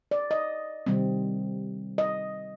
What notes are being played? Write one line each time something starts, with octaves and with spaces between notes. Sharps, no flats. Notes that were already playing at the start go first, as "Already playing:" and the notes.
D5
D#5
C3 D#3 G3 C4
D#5